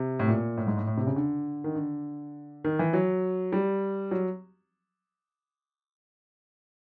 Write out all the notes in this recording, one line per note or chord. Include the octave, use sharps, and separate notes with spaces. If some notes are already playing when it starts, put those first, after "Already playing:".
Already playing: C3
A2
A#2
A2
G#2
A2
A2
C3
C#3
D3
D#3
D3
D#3
E3
F#3
G3
F#3